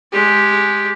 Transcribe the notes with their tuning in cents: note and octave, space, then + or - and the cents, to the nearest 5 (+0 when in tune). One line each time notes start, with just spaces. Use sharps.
G#3 +5 G4 +0